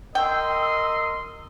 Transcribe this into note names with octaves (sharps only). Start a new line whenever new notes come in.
A#4 D#5 G5 C6 E6